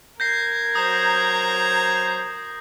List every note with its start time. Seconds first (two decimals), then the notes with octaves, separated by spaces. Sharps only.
0.20 A#4 G6 G#6 A#6 C7
0.75 F#3 C5 A#5 D#6